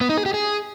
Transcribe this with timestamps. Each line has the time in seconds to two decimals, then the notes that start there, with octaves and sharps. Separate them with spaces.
0.01 B3
0.09 D#4
0.18 G#4
0.26 G4
0.34 G#4